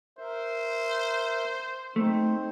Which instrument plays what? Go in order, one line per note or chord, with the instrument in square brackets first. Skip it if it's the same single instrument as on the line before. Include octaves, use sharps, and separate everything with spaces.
[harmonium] A#4 E5 [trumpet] C5
[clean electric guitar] A3 [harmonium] C4 D#4 C5